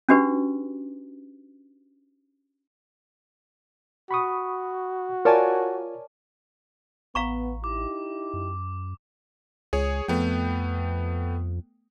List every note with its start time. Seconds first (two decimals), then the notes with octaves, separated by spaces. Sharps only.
0.09 C#4 D4 F#4 G4 B4
4.11 F#4 B5 C#6 D#6
5.25 F4 A#4 C#5 D5 G#5 A5
7.15 A1 B3 F5 A#5 C#6
7.64 D#4 E4 G4 D6
8.33 F#2
9.73 C#2 G#4 C#5
10.08 F2 A3 B3 G5